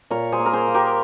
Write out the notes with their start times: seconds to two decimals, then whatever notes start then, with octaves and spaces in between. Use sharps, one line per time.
0.10 A#2 A#4 C#5
0.32 G#4 C5
0.40 A#3
0.46 A#4
0.53 G#4 C5
0.68 A#3
0.75 G4 A#4